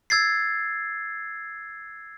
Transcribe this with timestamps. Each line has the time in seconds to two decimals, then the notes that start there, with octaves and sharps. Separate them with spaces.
0.10 E6 G#6 A6 C7